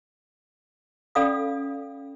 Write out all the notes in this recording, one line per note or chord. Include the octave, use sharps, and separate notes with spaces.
C#4 A4 D5 F5 B5 D#6